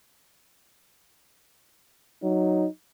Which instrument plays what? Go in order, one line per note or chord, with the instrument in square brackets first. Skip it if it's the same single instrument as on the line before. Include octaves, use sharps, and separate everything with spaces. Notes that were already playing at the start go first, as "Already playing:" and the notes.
[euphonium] F#3 [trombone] D#4